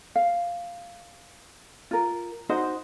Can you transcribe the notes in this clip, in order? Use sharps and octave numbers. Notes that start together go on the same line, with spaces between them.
F5
F4 A#4
D#4 F#4 C5 D#5